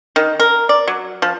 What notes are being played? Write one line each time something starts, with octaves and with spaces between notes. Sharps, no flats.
D#3
A#4
D5
F#3
F3